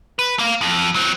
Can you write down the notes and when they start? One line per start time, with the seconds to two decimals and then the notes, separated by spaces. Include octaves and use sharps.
0.19 B4
0.39 A#3 F5
0.61 F2
0.95 F#3 C4